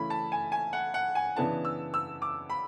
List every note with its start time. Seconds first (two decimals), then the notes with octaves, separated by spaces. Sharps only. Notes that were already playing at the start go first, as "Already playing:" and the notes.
Already playing: C#3 E3 A3 C#4 E4 B5
0.10 A5
0.32 G#5
0.52 G#5
0.73 F#5
0.94 F#5
1.15 G#5
1.36 C#3 E3 B3 D4 A5
1.65 E6
1.94 E6
2.22 D6
2.50 B5